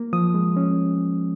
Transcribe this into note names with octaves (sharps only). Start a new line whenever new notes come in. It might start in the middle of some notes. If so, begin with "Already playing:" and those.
Already playing: A#3
F3 D#6
G#3
C#4